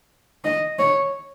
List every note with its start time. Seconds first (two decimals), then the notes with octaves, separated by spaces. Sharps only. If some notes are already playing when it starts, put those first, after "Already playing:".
0.44 D#5
0.78 C#5